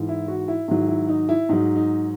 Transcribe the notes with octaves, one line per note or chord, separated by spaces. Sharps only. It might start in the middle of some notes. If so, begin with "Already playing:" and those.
Already playing: G#2 E3
E4
F#4
E4
G#2 D#3 F#3 E4
E4
D#4
E4
G#2 F#3 D#4
D#4